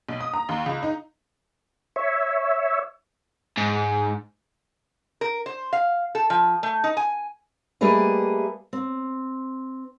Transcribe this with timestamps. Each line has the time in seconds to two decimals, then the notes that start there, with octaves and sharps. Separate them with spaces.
0.09 B1
0.20 D#6
0.34 A#5
0.49 D#2
0.66 C#2
0.83 D#4
1.96 C#5 E5
3.57 G#2
5.21 A#4
5.46 C5
5.73 F5
6.15 A4
6.30 F3
6.63 A3
6.84 D#4
6.97 G#5
7.81 G3 A3 A#3 G#4 B4 D#5
8.73 C4